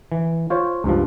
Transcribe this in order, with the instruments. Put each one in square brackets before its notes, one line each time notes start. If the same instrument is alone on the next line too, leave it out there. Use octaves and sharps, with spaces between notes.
[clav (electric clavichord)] E3
F4 C5 C#5
C#2 G2 F3